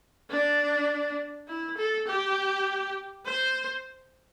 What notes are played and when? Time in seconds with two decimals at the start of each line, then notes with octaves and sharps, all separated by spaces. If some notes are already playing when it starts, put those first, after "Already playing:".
0.30 D4
1.48 E4
1.77 A4
2.07 G4
3.25 C5